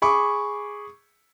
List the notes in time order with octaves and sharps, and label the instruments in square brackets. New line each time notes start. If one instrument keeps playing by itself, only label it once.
[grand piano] G#4 B5 C#6 D6